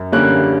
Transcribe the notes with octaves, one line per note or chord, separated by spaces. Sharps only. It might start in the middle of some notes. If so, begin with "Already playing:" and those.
Already playing: F#2
D3 G3 A#3 C#4 F#6